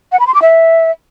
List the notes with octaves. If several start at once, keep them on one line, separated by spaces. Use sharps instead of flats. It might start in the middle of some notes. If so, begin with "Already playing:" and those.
F#5
B5
C6
D6
E5